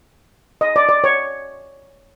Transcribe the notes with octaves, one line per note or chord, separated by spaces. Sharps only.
D#5
D5
D5
C#5